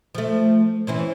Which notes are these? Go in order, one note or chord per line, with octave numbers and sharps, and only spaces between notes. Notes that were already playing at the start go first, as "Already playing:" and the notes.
F3 A3
E3 C4 C#4